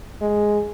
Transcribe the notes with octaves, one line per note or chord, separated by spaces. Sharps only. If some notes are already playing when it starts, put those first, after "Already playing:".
G#3